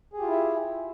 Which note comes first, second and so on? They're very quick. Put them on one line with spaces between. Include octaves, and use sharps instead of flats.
G#4 G4 F4 E4 E5